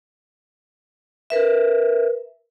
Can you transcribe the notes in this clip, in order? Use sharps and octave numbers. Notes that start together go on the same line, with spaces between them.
A#4 B4 E5